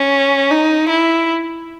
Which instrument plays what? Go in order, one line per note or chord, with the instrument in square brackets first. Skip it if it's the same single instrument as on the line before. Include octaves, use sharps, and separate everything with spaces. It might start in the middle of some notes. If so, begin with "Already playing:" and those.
Already playing: [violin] C#4
D#4
E4